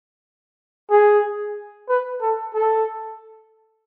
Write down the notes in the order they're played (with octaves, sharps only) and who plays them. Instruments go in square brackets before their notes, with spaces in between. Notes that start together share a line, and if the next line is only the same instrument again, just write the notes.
[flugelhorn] G#4
B4
A4
A4